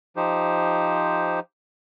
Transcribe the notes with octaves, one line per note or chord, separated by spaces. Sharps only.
F3 D#4 G4 C5